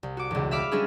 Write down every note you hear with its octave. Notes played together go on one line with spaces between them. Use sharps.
C2
F#4 D6
E1 C#2
E5 F5 B5 D6 F6
G3 G#3 C#4 D4 G#4 B4